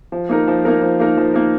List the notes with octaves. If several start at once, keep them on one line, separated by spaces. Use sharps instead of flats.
F3
A#3 D#4 A#4
F3
A#3 D#4 A#4
F3
A#3 D#4 A#4
F3
A#3 D#4 A#4